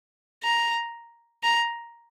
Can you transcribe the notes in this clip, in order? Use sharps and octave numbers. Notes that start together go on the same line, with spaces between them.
A#5
A#5